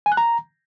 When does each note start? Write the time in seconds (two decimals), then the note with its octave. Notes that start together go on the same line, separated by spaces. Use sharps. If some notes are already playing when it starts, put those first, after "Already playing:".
0.06 G#5
0.12 F#6
0.17 A#5